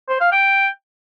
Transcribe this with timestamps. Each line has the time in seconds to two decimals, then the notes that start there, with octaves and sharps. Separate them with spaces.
0.09 C5
0.20 F5
0.32 G5